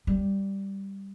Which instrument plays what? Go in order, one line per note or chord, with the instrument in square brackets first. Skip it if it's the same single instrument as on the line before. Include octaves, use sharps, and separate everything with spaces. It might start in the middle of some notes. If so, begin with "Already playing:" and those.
[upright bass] G3